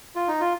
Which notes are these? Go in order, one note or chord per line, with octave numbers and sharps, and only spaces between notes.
F4
D#4
F4